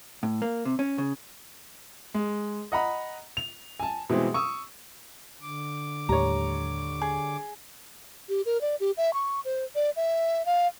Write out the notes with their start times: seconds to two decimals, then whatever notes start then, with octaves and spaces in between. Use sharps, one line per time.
0.23 A2
0.42 A#3
0.65 C3
0.79 C#4
0.98 C#3
2.14 G#3
2.72 D#5 F#5 A#5 B5
3.37 F7
3.80 G#5 A5
4.10 B2 E3 G3 G#3 C4 G4
4.34 C#6 D#6 E6
5.41 D3 D6
6.09 D#2 A2 G3 A3 C#5 A#5
7.02 G#4
8.29 G4
8.46 A#4
8.61 D5
8.80 G4
8.97 E5
9.14 C#6
9.45 C5
9.75 D5
9.96 E5
10.46 F5